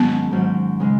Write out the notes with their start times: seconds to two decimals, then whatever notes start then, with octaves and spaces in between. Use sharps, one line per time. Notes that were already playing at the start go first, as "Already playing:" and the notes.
Already playing: G#2 D#3 F#3 B3 C#4
0.31 G#2 D#3 F#3 C#4
0.80 C#3 G#3